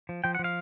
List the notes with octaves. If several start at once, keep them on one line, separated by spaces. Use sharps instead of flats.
F3
F3 G5
F#5
F3
F5